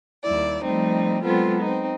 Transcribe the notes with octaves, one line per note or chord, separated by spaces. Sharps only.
D#2 G3 E4 D5
F3 G3 A3 C4 D#4
F#3 G#3 B3 C4 F4 A4
C4 D#4